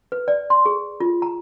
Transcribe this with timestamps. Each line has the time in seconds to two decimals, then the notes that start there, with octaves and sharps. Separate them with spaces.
0.12 B4
0.28 D5
0.50 C6
0.66 G#4
1.00 F4
1.22 A#5